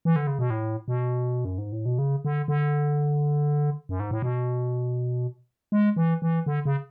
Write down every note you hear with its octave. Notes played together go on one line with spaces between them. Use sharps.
E3
D3
C#3
B2
A2
B2
F#2
G#2
A2
B2
C#3
D3
D3
F#2
G#2
A2
B2
G#3
E3
E3
D3
C#3